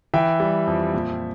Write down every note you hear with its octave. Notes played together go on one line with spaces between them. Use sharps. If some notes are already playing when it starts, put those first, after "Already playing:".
E3 E5 G5
G3
F2
A#2